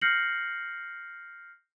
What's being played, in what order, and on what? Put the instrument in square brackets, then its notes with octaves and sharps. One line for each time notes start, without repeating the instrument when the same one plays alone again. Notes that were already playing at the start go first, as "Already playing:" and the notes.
[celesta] F6 G6 A#6 C7 C#7 F#7